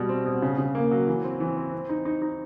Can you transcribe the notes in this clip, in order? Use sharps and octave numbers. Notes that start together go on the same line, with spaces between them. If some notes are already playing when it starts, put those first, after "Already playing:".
Already playing: B2 G3 F#4
C4
B2
C#3
C#3
A#3
F#3
E3
C4
E3
C4
C4
D#4
D#4
D#4